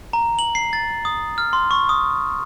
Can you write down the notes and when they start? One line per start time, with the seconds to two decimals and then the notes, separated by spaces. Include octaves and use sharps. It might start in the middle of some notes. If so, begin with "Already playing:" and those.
0.13 A#5
0.39 F#7
0.55 C7
0.73 A6
1.05 D#6
1.38 F6
1.53 C6
1.71 C#6
1.89 D#6